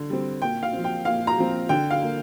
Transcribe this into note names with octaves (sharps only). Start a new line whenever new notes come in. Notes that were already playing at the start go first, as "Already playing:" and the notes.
Already playing: D3
G3 C4
A#2 G5
F5
F3 C4
G5
A#2 F5
A#5
F3 C4
D3 G5
F5
A#3